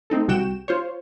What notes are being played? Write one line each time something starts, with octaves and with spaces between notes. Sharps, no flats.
A3 C4 D#4 A4
C2 C3 F#4 G5 E7
F4 C5 C#5